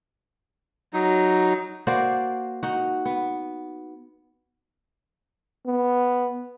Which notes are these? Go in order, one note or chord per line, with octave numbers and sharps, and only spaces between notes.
F#3 D#4
A#3 F#4 C5 D5
D#4 F#4
B3
B3